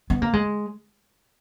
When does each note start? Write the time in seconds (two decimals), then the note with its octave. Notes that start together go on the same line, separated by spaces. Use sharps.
0.10 B3
0.22 A#3
0.33 G#3